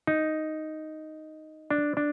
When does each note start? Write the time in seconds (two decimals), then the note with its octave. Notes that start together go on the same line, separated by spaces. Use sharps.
0.07 D#4
1.71 D4
1.97 D4